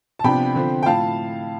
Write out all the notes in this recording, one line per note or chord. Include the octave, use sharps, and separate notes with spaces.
A5
C3 F3 B3 D4 G5 B5
D3 F3 C4
G5
A2 F3 F5 A5